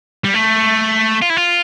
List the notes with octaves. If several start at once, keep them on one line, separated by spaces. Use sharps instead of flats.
G3
A3
F4
E4
F4